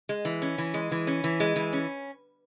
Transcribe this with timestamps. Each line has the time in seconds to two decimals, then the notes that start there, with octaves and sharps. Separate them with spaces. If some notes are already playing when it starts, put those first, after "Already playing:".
0.09 G#3
0.25 E3
0.42 C#4
0.58 E3
0.74 G#3
0.92 E3
1.07 C#4
1.24 E3
1.40 G#3
1.56 E3
1.73 C#4